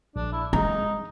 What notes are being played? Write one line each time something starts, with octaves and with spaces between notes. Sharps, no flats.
A#1 D4
E4
G#3 D#4 A#5